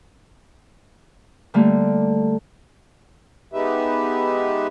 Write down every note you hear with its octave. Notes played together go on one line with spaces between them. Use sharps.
D3 G3 A3 A#3
G#3 B3 D#4 G4 B4 E5